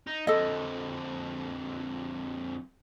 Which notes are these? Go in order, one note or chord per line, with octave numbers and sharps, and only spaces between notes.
D#4
F2 D3 A4 D#5